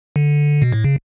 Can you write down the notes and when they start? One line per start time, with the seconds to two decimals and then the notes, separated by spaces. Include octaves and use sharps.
0.16 D3
0.62 B2
0.72 A2
0.84 C#3